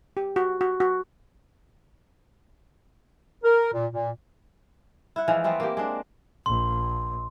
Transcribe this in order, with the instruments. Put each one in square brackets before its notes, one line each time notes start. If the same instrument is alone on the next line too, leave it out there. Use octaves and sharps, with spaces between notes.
[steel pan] G4
F#4
F#4
F#4
[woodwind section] A#4
A#2
A#2
[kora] E4 F#5
E3 F3 G#3
A3 B3 C4
A#3 G4
G#3 C4 D4
[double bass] A#1 [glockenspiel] C6